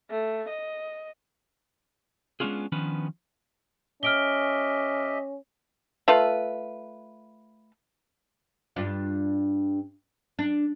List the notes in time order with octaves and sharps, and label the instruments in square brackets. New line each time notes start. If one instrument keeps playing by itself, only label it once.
[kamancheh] A3
D#5
[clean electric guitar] G#3 B3 C#4 D4 F4 G#4
D#3 F3 B3 C#4 D4 B4
[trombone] C#4 [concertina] G4 D#5 E5 [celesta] F6 D7 G7
[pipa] A3 F4 B4
[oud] G2 D4 F4
D4